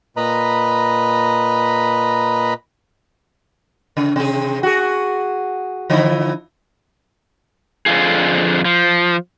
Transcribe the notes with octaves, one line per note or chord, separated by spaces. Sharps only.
A#2 B4 D#5 A#5 B5
C#3
C3 G#4
F#4 G#4
D3 F3 E4
F2 D3 F4 G#4
F3